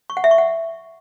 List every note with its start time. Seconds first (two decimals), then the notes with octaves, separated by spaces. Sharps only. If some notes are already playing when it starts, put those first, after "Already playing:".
0.10 C#6
0.17 F#5
0.24 E5
0.31 C#6
0.38 F#5